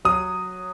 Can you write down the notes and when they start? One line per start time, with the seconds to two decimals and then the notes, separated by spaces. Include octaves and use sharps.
0.05 F#3 D#6